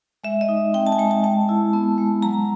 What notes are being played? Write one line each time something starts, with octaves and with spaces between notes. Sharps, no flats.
G#3 E5
D#5
D#4
C4 G5
A5
G#5
G#3 A5
A5
G#3 A5
E4
B3
G#3
F#3 A#5